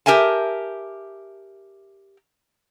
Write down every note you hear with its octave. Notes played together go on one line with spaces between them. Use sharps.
G4 A#4 E5 G#5 A5